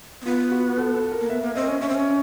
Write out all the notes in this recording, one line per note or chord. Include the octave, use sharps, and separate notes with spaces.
C4
B3 F4
F#4
A4
A4
A#4
A#3
B3 E5
A#3
C4 D#5
C#4
C#4 E5
C4
C#4